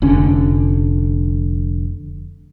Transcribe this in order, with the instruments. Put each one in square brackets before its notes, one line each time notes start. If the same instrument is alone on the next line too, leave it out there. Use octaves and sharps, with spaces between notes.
[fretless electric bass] F1 D3 C#4